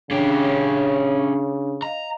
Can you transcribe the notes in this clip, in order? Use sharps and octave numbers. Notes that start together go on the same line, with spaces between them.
C#3 C#4 D4 G4
D#5 F5 A#5